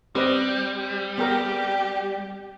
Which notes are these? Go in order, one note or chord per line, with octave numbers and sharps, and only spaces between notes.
G3 C4 G4 B4 D#5
B3 G4 G#4 A#4